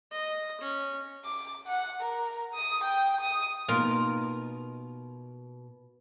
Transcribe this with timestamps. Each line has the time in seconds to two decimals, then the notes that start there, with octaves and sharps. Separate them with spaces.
0.11 D#5
0.61 C#4
1.25 D6
1.67 F#5
2.01 A#4
2.54 D#6
2.84 G5
3.21 D#6
3.68 B2 A#3 D#4 F4 A#4